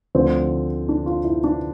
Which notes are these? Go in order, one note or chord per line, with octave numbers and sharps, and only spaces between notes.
D2 D3 F3 C4
D4
F4
E4
D4